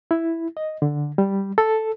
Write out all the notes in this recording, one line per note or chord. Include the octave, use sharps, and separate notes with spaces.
E4
D#5
D3
G3
A4